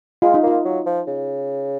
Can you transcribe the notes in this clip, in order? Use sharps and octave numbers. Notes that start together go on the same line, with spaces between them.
G#3 F4
D#4
A#3 F4
F#3
F3
C#3